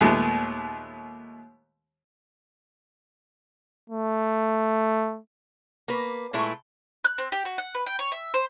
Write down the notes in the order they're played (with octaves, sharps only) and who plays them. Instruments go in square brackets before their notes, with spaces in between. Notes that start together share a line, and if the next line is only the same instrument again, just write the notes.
[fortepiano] D#2 A#2 G#3 A3 B3
[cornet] A3
[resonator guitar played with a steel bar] A#3 B4
A#2 G#3 A3 E4
[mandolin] F#6
C4
G4
F#4
F#5
B4
G5
C#5
E5
C5